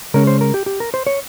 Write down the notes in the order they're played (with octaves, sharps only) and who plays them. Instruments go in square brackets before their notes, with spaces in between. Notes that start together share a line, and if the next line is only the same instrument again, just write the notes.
[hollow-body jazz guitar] C#3 G#3 C#4 A#4
C5
A#4
G4
G4
A#4
C5
C#5